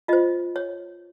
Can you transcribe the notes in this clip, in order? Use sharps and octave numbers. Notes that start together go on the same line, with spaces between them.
F4 C5 D#5
C#5